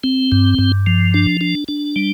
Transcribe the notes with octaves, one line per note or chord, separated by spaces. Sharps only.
C4
G2
G2
F3
D4
D4
D4
G3